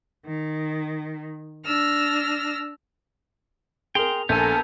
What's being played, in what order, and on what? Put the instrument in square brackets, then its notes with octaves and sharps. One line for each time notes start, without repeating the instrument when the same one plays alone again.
[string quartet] D#3
D4 E6 F6 A#6
[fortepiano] G#4 A#4 [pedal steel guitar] G5 C6 [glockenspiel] F7
[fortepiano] A#1 [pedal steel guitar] B3 G#5 [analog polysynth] A4 A#4 [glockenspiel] G6 G#6